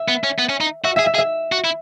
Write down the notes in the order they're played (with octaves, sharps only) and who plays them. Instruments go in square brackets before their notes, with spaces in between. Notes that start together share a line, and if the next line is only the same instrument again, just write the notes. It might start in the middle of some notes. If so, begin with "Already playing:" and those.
Already playing: [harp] E5
[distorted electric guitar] B3
C#4
B3
C#4
D#4
[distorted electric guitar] F#4 [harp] E5
[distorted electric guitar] G#4 [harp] E5
[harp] E5
[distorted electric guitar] G#4
[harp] E5
[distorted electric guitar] F#4
E4